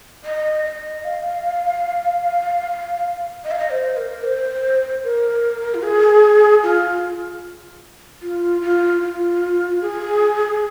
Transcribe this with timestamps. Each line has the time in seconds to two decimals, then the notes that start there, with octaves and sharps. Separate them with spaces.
0.25 D#5
0.65 D#5
1.04 F5
3.45 D#5
3.51 F5
3.59 D#5
3.70 C5
3.97 A#4
4.24 C5
5.04 A#4
5.74 F4
5.83 G#4
6.63 F4
8.22 F4
8.62 F4
9.02 F4
9.81 G#4